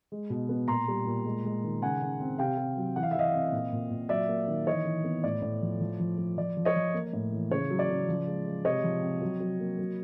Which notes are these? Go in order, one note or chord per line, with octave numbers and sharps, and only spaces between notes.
G#3
B2
B3
A#2 A#5 C6
G3
A#2
G#3
G#3
D#3
C#3 F#5 G#5
C#3
C4
C3 F5 G5
C3
F#3
E3 F#5
F5
E5
E3 D#5 F5
C4
A#2
A#2
A#2
F#3 D5 E5
A#3
D#3
E3 C#5 D#5
E3
B3
A2 D5
A2
F3
F3
F3
F3
F3 D5
F3
C#5 D#5
F3
A#3
A2
E3
C#3 C#5
F#3
D5
C#3
F3
G#3
G#3
C3 C#5 D#5
F3
C4
F#3
F#3
A#3
F#3